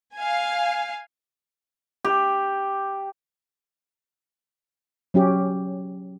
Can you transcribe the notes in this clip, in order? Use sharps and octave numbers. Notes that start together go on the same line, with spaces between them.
F5 G#5
G4
F#3 C#4 G4